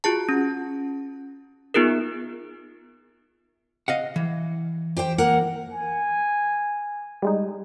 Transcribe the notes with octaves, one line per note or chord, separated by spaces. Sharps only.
F4 F#4 G#4 A5
C#4
B3 D#4 F4 G#4 A#4
D#5 F5 F#5
E3
G4 C5 G5
A#3 A#4 F#5
G#5
G3 G#3 D#4